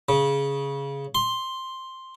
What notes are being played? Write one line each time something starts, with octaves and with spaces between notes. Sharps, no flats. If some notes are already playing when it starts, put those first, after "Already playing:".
C#3
C6